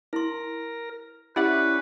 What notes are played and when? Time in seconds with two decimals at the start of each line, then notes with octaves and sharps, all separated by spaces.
0.13 E4 A#4 C6
1.36 C#4 E4 G4 B4 D5 F#5